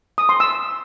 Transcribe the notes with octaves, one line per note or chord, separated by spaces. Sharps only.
D#6
C6
E6